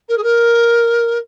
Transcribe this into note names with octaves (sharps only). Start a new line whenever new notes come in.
A#4
G#4
A#4